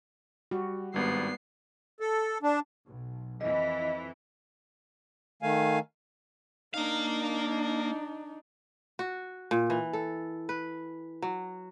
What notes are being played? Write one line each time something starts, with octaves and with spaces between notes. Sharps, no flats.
G3 F#4
G#1 G2 G3 B3 C7
A4
D4
B1
F2 E3 D#5
D#3 A3 F5 G#5
A#3 D4 D#4 F5
F#4
A#2
E3
A4
B4
F#3